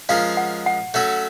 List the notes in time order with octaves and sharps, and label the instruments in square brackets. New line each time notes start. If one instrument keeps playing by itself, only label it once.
[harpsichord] F3 G#3 C#4 F4 A#4 [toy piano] F5
[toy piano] F#5
F#5
[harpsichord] F#3 A3 C#4 F#4 A4